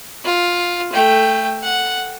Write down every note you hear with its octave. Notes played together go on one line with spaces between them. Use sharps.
F4
A3 G5
F#5